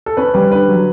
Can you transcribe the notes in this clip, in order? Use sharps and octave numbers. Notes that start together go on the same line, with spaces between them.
A4
C#4 B4
G3 B4
D3 B4
F#3